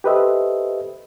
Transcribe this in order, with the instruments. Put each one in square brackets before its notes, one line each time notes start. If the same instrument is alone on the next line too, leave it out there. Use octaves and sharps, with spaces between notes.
[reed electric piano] G4 A4 B4 C5 D#5 E5